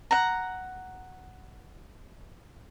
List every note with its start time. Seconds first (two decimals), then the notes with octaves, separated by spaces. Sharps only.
0.11 F#5 A#5